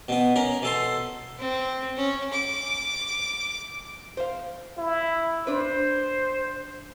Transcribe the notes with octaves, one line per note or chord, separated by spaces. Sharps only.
B2 B3
C#4 A#4
B2 A4 C6
C4
C#4
D6
C5 F5
E4
D4 B4 C5